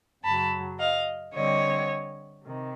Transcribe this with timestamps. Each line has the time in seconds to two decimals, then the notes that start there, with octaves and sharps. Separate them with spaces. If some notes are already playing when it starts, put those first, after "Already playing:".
0.24 F#2 C#3 F#3 A5 B5
0.79 D#5 F5
1.34 D3 G3 C4 C#5 D#5
2.44 C3 D#3